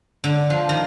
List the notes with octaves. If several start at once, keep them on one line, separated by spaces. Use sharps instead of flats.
D3
F3
D#3